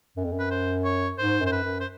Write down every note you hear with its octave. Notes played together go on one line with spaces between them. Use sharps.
F#2
F2
F#2
B4
C5
C#5
G#2 C5
F#2
C5
B4
F#2
C5